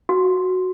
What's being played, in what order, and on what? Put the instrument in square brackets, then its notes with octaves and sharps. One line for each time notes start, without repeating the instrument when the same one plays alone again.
[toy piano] F#4